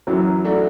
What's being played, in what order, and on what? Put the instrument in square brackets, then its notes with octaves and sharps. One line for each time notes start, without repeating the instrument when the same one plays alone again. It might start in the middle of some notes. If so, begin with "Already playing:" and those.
[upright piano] F#2 F#3 [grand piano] E3
[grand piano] A3 D4 F#4